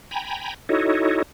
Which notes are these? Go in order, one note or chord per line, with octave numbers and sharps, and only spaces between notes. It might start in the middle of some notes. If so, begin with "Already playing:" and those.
G5 G#5 A#5 B5
D#4 E4 F#4 A4 C#5 D#5